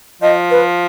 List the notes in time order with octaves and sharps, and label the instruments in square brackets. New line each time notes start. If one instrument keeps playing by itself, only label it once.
[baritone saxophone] F3 [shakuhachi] D#5
[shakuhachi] B4